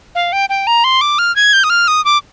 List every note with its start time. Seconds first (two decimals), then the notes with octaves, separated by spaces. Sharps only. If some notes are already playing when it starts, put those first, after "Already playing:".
0.15 F5
0.33 G5
0.50 G5
0.67 A#5
0.84 C6
1.01 D6
1.19 F6
1.36 G#6
1.53 G6
1.64 D#6
1.70 F6
1.88 D#6
2.05 D6